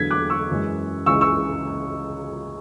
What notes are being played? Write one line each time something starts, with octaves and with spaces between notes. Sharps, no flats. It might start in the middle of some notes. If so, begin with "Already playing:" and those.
Already playing: E2 D3 F#3 A3 G#6 B6
D6 F#6
C#6 E6
F#2 E3 G#3
C#2 C#3 E3 G#3 C#6 E6
C#6 E6